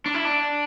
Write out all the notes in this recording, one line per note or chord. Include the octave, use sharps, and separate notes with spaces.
D4
E4
D4